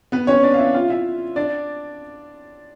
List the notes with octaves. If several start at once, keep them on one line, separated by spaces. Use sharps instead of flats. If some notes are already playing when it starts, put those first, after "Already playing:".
B3 B4
C#4 C#5
D4 D5
F5
E4 E5
F4 F5
E4 E5
D4 D5